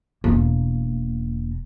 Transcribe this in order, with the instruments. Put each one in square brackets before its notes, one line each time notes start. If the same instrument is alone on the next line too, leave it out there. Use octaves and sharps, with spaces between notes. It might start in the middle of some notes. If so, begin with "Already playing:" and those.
[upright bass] E1 A#3